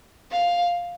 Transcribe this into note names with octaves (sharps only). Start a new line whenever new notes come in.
F5